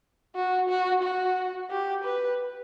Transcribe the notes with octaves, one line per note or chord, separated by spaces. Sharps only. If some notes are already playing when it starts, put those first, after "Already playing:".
F#4
F#4
F#4
G4
B4